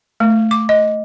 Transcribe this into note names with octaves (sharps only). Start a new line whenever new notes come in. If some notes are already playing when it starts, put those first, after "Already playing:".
A3
D6
D#5